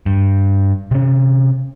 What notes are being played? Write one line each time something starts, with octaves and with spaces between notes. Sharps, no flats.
G2
C3 C#4